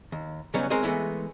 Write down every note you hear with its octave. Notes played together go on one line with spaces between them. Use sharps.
D#2
C#3 F#3 G3 B3 C#4 D#4
G#3 C4 A#4 C5 C#5 D#5
E3 G#3 A3 B3